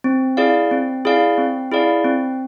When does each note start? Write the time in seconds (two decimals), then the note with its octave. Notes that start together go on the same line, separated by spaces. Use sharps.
0.04 C4
0.37 E4 G#4 D5 F5
0.71 C4
1.05 E4 G#4 D5 F5
1.38 C4
1.72 E4 G#4 D5 F5
2.04 C4